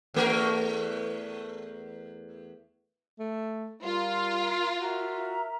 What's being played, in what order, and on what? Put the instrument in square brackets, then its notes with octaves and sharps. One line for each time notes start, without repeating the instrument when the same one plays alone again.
[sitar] E2 A3 A#4
[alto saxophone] A3
[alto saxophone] G3 [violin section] F4 [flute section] A#4 C6
[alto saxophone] F#4 [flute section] A#4 E5 A#5